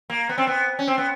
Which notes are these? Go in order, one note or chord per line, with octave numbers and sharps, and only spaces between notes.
A#3
B3
C4
B3
C#4
C4
B3